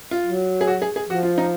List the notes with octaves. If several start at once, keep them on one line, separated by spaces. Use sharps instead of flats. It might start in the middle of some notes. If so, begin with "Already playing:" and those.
F4
F#3
G#4
F#4
G#4
G#4
F3 F#4
F4
D#4